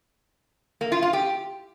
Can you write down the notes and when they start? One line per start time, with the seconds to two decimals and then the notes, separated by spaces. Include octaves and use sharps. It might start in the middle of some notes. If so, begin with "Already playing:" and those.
0.81 A#3
0.92 F4
1.02 F4
1.13 G4